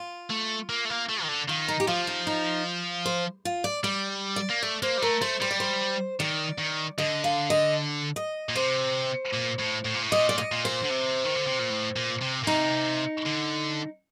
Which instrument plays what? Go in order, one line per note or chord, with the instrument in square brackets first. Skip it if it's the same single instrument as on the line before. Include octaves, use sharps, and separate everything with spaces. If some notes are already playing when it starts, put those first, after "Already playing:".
Already playing: [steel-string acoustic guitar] F4
[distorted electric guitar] A3
A#3
A3
A#3
A3
D#3
D3
[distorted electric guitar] D#3 [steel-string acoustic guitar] F4
[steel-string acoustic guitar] D#4
G4
[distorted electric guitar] F3 [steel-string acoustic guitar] F4
[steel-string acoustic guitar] D#4
D#4
C5
F4
D5
[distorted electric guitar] G3 [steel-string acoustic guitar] D5
[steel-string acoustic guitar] D5
[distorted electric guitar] A#3
[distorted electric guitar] A3 [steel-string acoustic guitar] D5
[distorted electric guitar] A#3 [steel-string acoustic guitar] C5
[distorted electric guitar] G3
[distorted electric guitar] A3 [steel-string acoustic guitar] A#4
[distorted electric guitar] A3 [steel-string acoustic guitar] C5
[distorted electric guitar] G3 [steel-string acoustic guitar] C5
[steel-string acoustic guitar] D5
C5
[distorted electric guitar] D#3 [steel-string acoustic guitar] D5
[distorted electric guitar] D#3
[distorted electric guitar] D3 [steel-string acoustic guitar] D#5
[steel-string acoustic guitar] F5
D#5
D#5
[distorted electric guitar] A#2
[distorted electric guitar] C3 [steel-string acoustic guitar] C5
[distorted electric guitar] A#2
A2
A2
A#2
A2
[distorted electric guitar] A#2 [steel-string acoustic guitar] D#5
[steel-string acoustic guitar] D5
D#5
[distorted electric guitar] A#2
[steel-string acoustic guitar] C5
[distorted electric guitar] D3
C3
D#3
D3
C3
A#2
A2
A#2
C3
A#2
[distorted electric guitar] C3 [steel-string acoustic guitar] D#4
[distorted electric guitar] D3